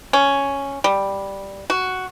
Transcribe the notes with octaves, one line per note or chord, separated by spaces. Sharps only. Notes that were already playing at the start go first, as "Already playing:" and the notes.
C#4
G3
F#4